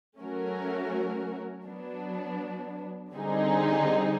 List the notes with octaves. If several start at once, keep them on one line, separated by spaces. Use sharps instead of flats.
F#3 A3 C#4 F#4 A#4
F#3 B3 D4
D3 G3 C4 D#4 G#4